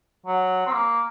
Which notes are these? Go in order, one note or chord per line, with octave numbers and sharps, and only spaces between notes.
F#3
C4
A#3